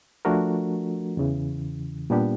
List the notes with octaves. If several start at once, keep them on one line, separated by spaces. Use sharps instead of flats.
F3 A3 D4 F#4 A#4
E2 C#3 E3
A#2 G3 B3 D4 G4